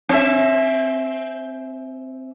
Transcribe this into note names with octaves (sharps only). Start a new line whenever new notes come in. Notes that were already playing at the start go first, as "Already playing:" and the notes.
C4 E5